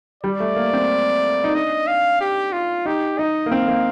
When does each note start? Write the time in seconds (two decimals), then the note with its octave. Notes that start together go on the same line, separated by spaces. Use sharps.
0.23 G3 D5
0.40 A3
0.56 A#3
0.73 C4
1.44 D#4
1.54 D4 D#5
1.87 F5
2.21 G4
2.53 F4
2.86 D#4 G4
3.19 D#4 D#5
3.46 A#3
3.51 C4 F5
3.68 A#3